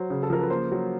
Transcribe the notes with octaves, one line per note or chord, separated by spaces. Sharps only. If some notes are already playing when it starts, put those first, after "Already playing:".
Already playing: F#3 C5
C#3
A4
F3 A#4
B4
A#3 C5
F#3